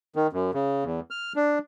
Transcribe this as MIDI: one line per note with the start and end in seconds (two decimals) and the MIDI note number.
0.16 0.27 51
0.33 0.51 42
0.54 0.84 49
0.84 1.00 40
1.11 1.33 89
1.36 1.59 62